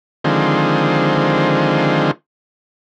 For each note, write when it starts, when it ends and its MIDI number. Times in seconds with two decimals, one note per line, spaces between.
0.24 2.11 50
0.24 2.11 51
0.24 2.11 53
0.24 2.11 56
0.24 2.11 60